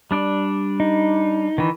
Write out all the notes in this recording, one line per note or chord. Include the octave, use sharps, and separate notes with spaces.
G3 D4 D5
D#4
D#3 E3